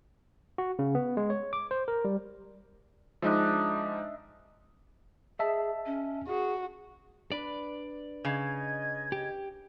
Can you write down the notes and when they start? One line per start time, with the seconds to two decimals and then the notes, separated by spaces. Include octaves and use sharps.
0.58 F#4
0.79 C#3
0.95 B3
1.17 G#3
1.30 C#5
1.53 D6
1.71 C5
1.88 A#4
2.05 G3
3.22 F3 G#3 D4 D#4 D#5 E5
5.39 G#4 D#5 E5 A5
5.86 C#4
6.28 F#4 G#4
7.32 D4 B4 D5
8.25 C#3 D#5 G#6
9.12 G4